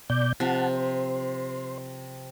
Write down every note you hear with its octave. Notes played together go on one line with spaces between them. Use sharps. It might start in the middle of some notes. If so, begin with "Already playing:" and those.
B2 D5 G6
C3 F3 F#5 A5
C5